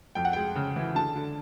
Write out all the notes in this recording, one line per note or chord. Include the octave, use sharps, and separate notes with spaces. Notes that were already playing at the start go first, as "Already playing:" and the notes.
F2 G5
F#5
G#3 G5
C#3
E3
D3 A5
D3